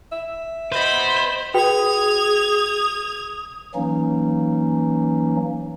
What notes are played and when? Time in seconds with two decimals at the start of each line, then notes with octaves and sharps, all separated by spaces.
0.12 E5
0.72 B4 C5 D#5 B5
1.54 F#4 G#4 B4 G5 D#6 G#6 F7
3.75 E3 F#3 A#3 C#4 D#4